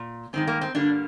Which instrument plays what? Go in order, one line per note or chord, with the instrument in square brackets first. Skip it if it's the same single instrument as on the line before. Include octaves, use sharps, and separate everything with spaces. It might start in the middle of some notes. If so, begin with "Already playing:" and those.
Already playing: [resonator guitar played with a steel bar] A#2
G2 D#3 G#3 C4
A#3
C4
G2 D3 G3 A#3 D4